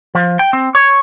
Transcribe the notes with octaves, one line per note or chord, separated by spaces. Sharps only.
F3
G5
C4
C#5